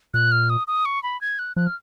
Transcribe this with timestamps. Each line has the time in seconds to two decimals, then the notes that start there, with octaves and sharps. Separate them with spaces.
0.14 A#2 F#6
0.32 F6
0.50 D#6
0.67 D#6
0.85 C#6
1.03 B5
1.21 G#6
1.39 F#6
1.56 F3 F#6
1.67 F6